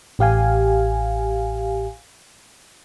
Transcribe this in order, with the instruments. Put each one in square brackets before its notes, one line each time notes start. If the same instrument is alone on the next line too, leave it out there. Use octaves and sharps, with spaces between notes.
[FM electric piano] A1 G4 F5 G#5